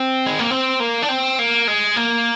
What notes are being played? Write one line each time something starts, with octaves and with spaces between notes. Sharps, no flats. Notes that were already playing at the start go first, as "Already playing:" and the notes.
Already playing: C4
G#3
A#3
C4
A#3
D4
C4
A#3
G#3
A#3